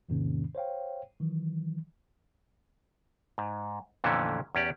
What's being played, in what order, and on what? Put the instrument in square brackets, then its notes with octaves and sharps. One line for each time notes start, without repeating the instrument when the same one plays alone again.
[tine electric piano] E2 G#2 C3 D#3 A#3 C#4
C5 C#5 F5 G5
D#3 E3 F#3
[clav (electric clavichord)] G#2
F2 A#2 D3 E3 A3 C#4
E2 C#4 G4 D5